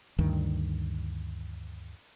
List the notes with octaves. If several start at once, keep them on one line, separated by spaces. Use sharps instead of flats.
D2 G2 D#3